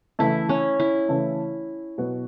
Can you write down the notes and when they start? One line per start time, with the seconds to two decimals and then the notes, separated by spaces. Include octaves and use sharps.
0.19 C#3 E3 A3 E4
0.49 C#4
0.80 E4
1.09 C#3 E3 A3
1.98 B2 F#3 B3 F#4